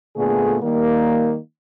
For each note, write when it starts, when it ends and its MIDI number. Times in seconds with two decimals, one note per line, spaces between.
0.17 0.57 46
0.17 0.57 50
0.17 0.57 57
0.17 0.57 59
0.17 0.57 68
0.63 1.38 51
0.63 1.38 55
0.63 1.38 58